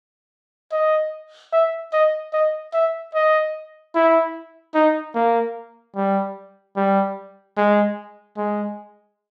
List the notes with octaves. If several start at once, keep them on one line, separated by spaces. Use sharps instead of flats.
D#5
E5
D#5
D#5
E5
D#5
E4
D#4
A#3
G3
G3
G#3
G#3